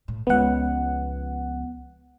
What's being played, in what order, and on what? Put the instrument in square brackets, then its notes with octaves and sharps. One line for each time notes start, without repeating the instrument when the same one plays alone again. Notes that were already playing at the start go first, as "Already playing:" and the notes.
[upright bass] A2
[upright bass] C#2 F3 [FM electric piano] B3 F#5